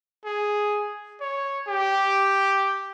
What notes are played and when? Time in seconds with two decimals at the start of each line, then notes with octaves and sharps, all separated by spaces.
0.25 G#4
1.21 C#5
1.68 G4